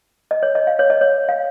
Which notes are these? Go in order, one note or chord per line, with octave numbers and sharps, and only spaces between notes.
D#5
C#5
D#5
F5
C#5
D#5
C#5
F5